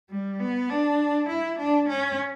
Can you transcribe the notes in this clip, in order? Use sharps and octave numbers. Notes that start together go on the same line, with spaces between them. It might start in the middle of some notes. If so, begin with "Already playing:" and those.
G3
B3
D4
E4
D4
C#4